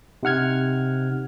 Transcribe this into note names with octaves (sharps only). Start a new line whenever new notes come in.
C3 D#4 F#5 F6 G#6